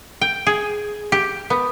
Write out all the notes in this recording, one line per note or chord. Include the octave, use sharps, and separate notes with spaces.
G5
G#4
G4
B3